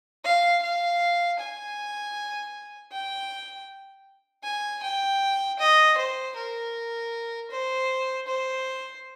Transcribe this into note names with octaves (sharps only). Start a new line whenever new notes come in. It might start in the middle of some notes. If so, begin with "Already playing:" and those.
F5
F5
G#5
G5
G#5
G5
D#5
C5
A#4
C5
C5